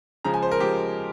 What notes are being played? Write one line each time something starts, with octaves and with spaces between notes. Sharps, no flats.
C#3 F3 G#3 A#5
G#5
C5
A#4
C#3 F3 G#3 G4